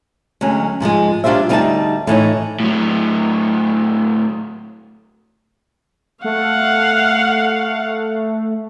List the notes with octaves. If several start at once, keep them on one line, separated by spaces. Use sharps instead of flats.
D2 F#3 G#3 C#4
G#2 F3 F#3 G#3
F#3 D4 F4 G4 C5 E5
D2 G3 D#4 B4 E5 A5
A2 E3 D#4 C#5
A2 F#3
A3 F5 F#5